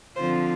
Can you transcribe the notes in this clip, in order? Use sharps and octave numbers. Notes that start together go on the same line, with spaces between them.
D3 F3 C4 F4 C5